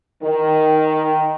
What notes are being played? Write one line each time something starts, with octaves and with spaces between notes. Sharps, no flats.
D#3